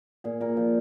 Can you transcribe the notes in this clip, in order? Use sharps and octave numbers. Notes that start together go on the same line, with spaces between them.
A#2 G#4
A#2 A#4
F3